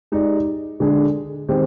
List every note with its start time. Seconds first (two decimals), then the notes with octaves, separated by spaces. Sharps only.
0.12 G#3 D#4 G4 D5
0.80 D3 G#3 D4 G#4
1.49 D#3 G#3 C4 G4 C5